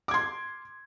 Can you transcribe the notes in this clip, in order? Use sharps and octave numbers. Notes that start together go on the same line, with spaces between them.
C6 D6 G#6